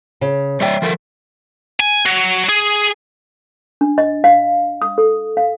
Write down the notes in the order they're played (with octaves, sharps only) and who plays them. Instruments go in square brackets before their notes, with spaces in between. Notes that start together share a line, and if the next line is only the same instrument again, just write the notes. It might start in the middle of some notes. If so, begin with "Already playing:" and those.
[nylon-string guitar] C#3
[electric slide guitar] G3 C#5 D5 [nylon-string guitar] E5 G5
[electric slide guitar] F3 A4 A#4
[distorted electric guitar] G#5
F#3
G#4
[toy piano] D4
D#5
F5
D#6
A4
F5